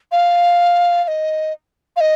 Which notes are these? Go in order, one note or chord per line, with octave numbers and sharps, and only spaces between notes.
F5
F5
D#5
F5
D#5